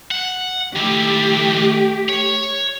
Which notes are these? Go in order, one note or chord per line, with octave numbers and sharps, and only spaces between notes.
F#5
D#3 A3 E4 G4
C#5